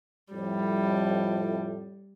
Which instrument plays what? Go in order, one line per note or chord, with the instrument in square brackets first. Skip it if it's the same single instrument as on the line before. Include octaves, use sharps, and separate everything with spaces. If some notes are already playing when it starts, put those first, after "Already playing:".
[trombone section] F2 A2 [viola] G3